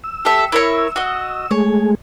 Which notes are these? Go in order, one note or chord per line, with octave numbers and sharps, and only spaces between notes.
E6
G4 A4 E5
E4 A#4 C#5
F#4 D#5
G#3 A3 G#4 C#5